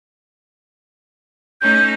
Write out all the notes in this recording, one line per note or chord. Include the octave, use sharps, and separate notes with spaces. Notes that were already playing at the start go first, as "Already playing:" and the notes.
A3 C#4 D#4 G6